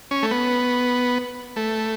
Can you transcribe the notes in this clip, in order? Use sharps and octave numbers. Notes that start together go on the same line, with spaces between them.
C#4
A3
B3
A3